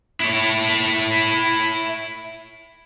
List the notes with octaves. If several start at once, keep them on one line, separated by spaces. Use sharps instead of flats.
E4 C#5